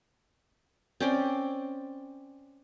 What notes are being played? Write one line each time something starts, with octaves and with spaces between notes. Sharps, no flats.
C4 C#4 D5